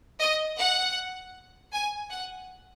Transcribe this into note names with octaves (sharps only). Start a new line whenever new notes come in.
D#5
F#5
G#5
F#5